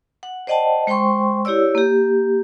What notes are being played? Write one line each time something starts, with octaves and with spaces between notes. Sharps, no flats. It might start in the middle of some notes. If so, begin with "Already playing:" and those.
F#5
C5 D5 D#5 F#5 G5 A5
G#3 C5 G5 C6 C#6
E4 G4 C#5 D5 E6
A#3 G4